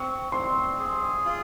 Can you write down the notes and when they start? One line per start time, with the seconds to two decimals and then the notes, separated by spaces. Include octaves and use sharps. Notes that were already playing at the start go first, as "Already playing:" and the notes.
Already playing: C4 C#6
0.32 C4 C6
0.79 G#4
1.25 F4